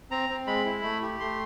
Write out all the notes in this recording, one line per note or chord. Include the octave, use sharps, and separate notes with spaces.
C4 A#5
C4
G#3 B5
E4
A3
G4
A3 C6